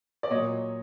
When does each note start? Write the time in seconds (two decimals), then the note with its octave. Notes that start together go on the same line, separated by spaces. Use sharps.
0.23 D5
0.30 A#2 F#3 C#5 D#5